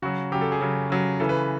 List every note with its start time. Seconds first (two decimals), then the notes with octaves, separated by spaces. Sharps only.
0.02 C#3 F#3 F#4
0.32 C#3 F#3 G4
0.41 A4
0.52 G#4
0.61 C#3 F#3
0.90 C#3 F#3
1.20 C#3 E3 A4
1.29 B4